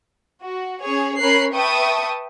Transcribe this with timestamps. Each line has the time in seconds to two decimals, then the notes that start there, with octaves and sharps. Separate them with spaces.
0.43 F#4
0.82 C#4 G#4 C#5
1.20 C#4 A#4 C#5 B5 F#6 C7
1.54 B4 E5 G5 A5 C#6 D#6